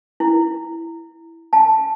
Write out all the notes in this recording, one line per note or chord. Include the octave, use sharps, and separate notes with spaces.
E4
A5